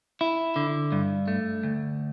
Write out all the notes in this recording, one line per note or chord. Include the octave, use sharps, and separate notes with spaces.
E4
D3
G2
A3
D2